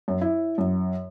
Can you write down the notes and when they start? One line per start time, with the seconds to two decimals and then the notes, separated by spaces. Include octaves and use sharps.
0.08 F#2
0.21 E4
0.58 F#2